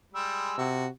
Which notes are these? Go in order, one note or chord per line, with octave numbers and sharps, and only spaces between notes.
G3 G#3 E6
C3 F#4